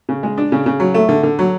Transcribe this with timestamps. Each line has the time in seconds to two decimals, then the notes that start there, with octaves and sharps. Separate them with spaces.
0.09 C#3
0.23 G#3
0.38 D4
0.52 C#3
0.66 C#3
0.80 F#3
0.94 A3
1.09 D3
1.23 D3
1.39 F#3